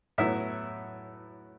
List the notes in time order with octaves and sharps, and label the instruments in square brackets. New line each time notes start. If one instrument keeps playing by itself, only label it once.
[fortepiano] A2 F#3 B3 E4 E5